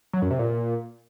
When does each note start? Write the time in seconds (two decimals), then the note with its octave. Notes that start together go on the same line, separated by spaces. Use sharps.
0.13 F#3
0.22 F#2
0.31 C3
0.39 A#2